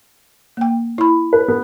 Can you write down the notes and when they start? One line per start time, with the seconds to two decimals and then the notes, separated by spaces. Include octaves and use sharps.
0.57 A#3 G5
0.98 E4 B5
1.33 B4
1.48 B3